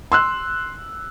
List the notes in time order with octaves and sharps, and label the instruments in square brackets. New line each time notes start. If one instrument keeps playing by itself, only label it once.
[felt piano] C6 E6 F#6